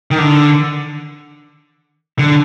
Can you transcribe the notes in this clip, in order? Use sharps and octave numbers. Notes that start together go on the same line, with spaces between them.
D#3
D3
D3